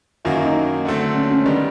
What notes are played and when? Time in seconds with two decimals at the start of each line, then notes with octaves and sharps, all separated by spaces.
0.25 F#2 D#3 F#3 A#3 E4
0.36 E4
0.46 D#4
0.85 D3 F#3 A3 C4
1.15 C#4
1.31 C#4
1.46 D#3 G3 B3 D4